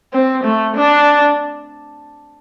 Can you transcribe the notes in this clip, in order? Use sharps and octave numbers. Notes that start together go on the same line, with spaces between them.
C4
A3
D4